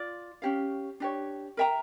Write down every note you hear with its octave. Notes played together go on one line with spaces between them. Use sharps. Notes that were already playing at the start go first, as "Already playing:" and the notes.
Already playing: F4 D5
C#4 G4 C#5 F5
D4 G4 C#5
A#4 E5 G5 A#5